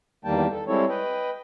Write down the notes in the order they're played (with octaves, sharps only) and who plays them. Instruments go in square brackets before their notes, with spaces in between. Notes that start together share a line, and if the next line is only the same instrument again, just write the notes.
[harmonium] E2 D#3 G3 A#3 G5 A5
A4
G3 G#3 C4 E4 A4 C#5
B4 D#5 G5